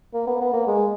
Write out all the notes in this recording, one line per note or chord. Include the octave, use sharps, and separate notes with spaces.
A#3
B3
B3
A#3
G#3